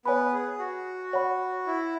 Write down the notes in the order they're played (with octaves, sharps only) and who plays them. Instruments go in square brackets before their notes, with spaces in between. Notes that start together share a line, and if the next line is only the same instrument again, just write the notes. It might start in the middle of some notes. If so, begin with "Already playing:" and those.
[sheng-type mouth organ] B3 B4 [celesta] C#5 G#5 B5
[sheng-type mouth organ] G#4
F#4
[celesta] C#5 F#5 B5
[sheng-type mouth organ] E4